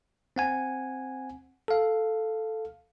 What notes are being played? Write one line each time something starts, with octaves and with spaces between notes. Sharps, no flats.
C4 F#5 G#5
A4 F5